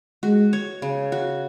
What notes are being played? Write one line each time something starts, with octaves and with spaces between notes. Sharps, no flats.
G#3 F#4
C#5
C#3
F#4